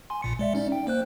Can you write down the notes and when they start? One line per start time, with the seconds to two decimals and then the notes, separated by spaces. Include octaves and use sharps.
0.10 G#5 C6
0.22 A#1 A#2 C#7
0.39 G#3 D5 E5
0.55 C#4 D#4 D5
0.72 G5
0.87 A#3 C5 F#6